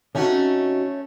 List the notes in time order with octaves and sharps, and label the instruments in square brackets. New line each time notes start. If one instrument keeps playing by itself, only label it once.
[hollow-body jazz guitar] C3 D#4 F#4 [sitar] A3 C#4